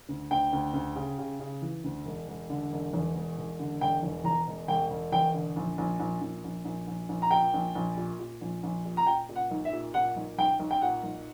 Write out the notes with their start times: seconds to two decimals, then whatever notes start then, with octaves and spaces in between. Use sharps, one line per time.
0.09 D2
0.31 D2 G5
0.53 D2
0.74 D2
0.96 C#3
1.18 C#3
1.39 C#3
1.62 E3
1.84 D2
2.05 E1
2.28 E1
2.50 D3
2.72 E1
2.93 E2
3.15 E1
3.37 E1
3.59 D3
3.81 E1 G5
4.03 E2
4.24 E2 A#5
4.47 E1
4.68 E1 G5
4.90 E1
5.12 E2 G5
5.34 D3
5.56 A#1
5.78 A#1
6.00 A#1
6.21 A#1
6.44 A#1
6.65 A#1
6.87 A#1
7.09 A#1
7.22 A#5
7.31 A#2 G5
7.54 A#1
7.75 A#1
7.97 A#2
8.19 A#2
8.41 A#1
8.63 A#1
8.85 A#2
8.97 A#5
9.07 A#2 G5
9.29 A#2
9.36 F#5
9.51 B1
9.65 E5
9.73 A#2
9.94 A#2 F#5
10.16 B1
10.38 B1 G5
10.59 B1
10.71 G5
10.82 A#2 F#5
11.04 B1